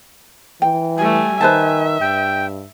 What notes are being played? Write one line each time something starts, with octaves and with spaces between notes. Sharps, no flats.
E3 G5
G3 A3 G#5
D#3 B4 C5 E5 A5
G2 G5